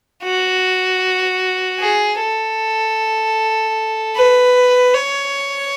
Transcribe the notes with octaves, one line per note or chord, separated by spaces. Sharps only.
F#4
G#4
A4
B4
C#5